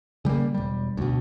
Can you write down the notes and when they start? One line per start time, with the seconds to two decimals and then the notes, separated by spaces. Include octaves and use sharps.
0.25 C#3 G3 A3 A#3
0.54 E1 G3
0.97 D2 B2